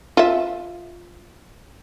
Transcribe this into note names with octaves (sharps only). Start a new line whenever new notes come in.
F4 E5